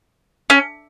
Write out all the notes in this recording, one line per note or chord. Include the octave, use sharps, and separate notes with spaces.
C#4